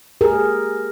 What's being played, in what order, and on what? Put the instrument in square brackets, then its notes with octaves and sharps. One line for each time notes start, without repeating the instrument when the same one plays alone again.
[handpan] G4 G#4 A#4